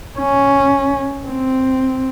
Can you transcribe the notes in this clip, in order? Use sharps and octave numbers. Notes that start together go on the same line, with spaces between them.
C#4
C4